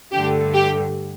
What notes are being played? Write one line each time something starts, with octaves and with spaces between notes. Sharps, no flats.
G2 D3 A3 G4
G4